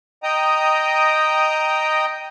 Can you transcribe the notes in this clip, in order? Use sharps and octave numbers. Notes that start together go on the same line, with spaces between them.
D#5 G5 A#5 D#6